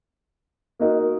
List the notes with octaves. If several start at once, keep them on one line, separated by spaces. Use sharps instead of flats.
A#3 D#4 F#4 A#4 D#5